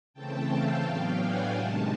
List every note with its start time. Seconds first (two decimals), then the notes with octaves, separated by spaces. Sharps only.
0.13 C#3 E3 A3 C4 G5 A5
0.48 F5 G5
0.83 A2 F#3 B3 D4 F5 G5
1.18 F#5 G#5
1.52 C3 D#3 G#3 G5 A5